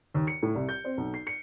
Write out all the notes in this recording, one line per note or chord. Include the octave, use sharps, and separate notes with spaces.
D#2
C#7
A2
C2
G6
C4
B1
C7
C#7